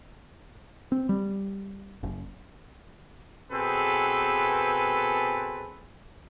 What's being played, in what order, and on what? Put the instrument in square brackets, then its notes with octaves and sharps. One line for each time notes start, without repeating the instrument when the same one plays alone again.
[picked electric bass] C4
G3
F#1
[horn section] B2 C4 G#4 A4 B4